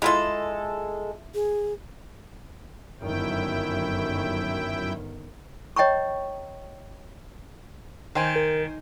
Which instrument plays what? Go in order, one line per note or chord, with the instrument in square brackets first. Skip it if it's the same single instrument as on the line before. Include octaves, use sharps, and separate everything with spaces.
[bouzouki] G#3 A4 [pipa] E4 F4
[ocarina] G#4
[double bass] G1 D#3 [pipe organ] F#2 E4 G5
[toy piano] C#5 D#5 G5 A#5 C#6
[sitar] D#3 [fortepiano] C5 G5 G#5
[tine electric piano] A#4